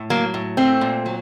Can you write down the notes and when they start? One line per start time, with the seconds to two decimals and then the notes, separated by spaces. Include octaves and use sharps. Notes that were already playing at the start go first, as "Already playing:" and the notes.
Already playing: A2
0.10 F#3 A#3
0.34 A2
0.57 A3 C4
0.81 A#2
1.06 F#3